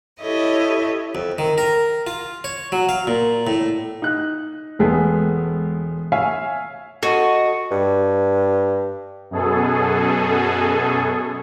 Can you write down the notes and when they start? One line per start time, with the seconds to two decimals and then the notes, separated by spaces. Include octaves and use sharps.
0.21 E4 G4 A4 C#5 D#5
1.15 F2
1.38 D#3
1.58 A#4
2.07 F4
2.44 C#5
2.72 F#3
2.89 F5
3.07 A#2
3.47 A2
4.02 D#4 F#6
4.79 E1 G#3 A3 B3 G#4
6.12 C#5 E5 F5 G#5
7.03 F#4 A4 D#5
7.71 G2
9.31 F#2 B2 G#4 A4